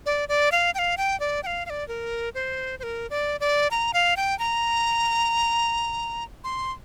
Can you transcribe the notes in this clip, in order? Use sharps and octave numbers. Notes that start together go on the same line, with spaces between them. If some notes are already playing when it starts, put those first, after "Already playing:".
D5
D5
F5
G5
F5
G5
D5
G5
F5
F5
D5
A#4
C5
C5
A#4
D5
D5
A#5
F5
G5
A#5
C6